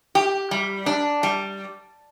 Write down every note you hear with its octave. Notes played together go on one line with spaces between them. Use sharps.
G4
G3
D4
G3